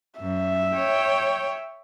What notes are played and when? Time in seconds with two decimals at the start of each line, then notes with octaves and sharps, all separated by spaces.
0.20 F#2 E5
0.74 C#5 G5